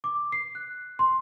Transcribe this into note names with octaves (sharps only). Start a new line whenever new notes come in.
D6
C7
F#6
C6